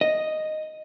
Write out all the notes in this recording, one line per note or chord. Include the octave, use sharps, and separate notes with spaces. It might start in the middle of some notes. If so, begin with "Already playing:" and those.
D#5